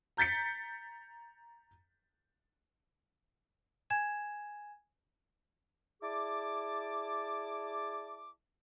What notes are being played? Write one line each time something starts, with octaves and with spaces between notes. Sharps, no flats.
A#5 G6 A6 B6 C#7
G#5 G#6 E7
E4 G#4 D5 A5 D6